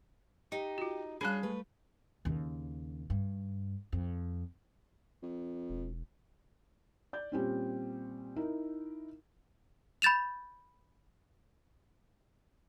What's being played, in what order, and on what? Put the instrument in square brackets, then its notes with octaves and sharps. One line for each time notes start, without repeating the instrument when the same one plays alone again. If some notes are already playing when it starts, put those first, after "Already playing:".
[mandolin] D#4 [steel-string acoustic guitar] G4
[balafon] F4 F#4
[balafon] G3 A5 B5 [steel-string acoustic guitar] C#4 D4 [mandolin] G#4 F#6
[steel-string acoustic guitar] A3 B4
[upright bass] D#2 C#3
G2
F2
[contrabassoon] F2
[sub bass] E1
[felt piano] D5 G6
A#2 G3 C4 C#4
D#4 E4 A#4
[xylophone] B5 G6 A6 E7 F7